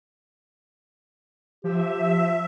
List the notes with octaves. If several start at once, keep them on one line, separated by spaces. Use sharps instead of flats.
F3 G4 E5